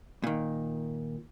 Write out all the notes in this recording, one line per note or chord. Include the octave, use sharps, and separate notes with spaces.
A#2 D#3